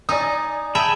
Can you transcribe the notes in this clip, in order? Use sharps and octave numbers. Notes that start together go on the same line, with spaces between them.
D#4 D5 G#5 D#6
G#4 E5 G5 A5 B5